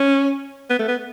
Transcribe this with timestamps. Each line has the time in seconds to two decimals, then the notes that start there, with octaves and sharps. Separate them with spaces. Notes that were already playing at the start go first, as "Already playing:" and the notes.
Already playing: C#4
0.70 B3
0.79 A3
0.88 B3